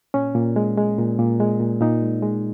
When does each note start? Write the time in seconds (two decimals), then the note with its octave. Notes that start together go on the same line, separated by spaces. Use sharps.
0.14 A#2 C#4
0.35 A#2
0.56 G#3
0.77 G#3
0.98 A#2
1.19 A#2
1.40 G#3
1.60 A#2
1.81 A#2 D#4
2.02 G#3
2.23 G#3